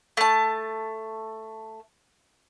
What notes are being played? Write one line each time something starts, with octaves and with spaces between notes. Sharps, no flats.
A3 A5